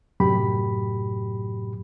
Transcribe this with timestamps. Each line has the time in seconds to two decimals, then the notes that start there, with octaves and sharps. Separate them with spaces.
0.20 F#2 A2 C3 F#3 G4 B5